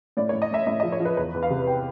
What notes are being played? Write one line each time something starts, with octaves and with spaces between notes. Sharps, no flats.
A2 D5
A2 C#5
D#5
A2 E5
A2 E5
F3 D#5
C#5
F3
B4
E2 B4
E2
F5
C3
G5